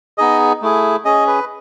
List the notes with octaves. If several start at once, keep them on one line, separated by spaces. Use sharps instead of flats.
B3 D#4 G#4 D#5
A3 E4 G#4
C#4 G#4 D#5
B4